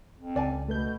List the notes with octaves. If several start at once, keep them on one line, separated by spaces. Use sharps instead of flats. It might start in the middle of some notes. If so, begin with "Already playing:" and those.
F2
C#2 D5 G#5 A5
B2 A3 B4 G6